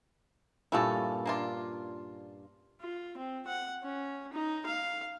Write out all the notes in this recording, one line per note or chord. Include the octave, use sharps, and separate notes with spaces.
G2 A#2 C#4 E4 A4
A#3 D4 F4
F4
C4
F#5
C#4
D#4
F5